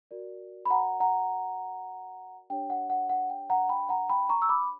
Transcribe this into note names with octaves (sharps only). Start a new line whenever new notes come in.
F#4 A#4 D5
B5
F#5 A#5
F#5 A#5
D4 G4 C#5 G5
F#5
F#5
F#5
G5
F#5 A#5
G5 B5
F#5 A#5
G5 B5
A#5 C#6
E6
B5 D6